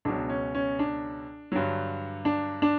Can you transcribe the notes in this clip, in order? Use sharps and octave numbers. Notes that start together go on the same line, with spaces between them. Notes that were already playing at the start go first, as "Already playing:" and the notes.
C#2 B2 F#3 D4
C#4
C#4
D4
G2 D3 F#3
D4
D4